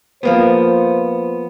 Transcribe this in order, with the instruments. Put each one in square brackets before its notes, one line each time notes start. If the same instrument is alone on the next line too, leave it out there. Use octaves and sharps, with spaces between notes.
[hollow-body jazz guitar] F3 A#3 B3 [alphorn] C5